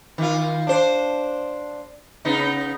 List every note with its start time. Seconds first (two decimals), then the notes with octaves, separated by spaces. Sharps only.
0.18 D#3 F4
0.67 D4 C5
2.25 C#3 B3 D#4